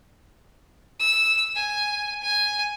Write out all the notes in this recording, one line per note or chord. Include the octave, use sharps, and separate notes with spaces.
E6
G#5
G#5